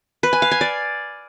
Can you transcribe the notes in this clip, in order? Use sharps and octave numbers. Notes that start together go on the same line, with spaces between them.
B4
G#5
F5
G#5
D5